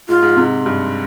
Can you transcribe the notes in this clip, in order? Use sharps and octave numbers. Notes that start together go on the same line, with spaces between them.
G#2 F4
G#2
G#2 C3
G2